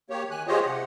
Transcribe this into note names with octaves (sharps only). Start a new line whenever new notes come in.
A#3 G4 C#5
D#3 G#5 F#6
F4 G4 G#4 C5 C#5 D#5
C3 F#5